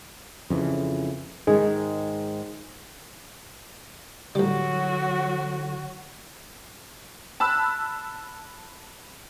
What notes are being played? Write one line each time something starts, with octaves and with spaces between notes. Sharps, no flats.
F2 C#3 E3
G#2 D#3 G#3
A1 D3 F#3 G3 F#4
A5 B5 E6 F#6